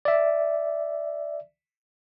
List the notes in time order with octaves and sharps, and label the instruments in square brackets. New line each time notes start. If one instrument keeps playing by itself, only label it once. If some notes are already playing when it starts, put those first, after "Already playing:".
[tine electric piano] D5 E5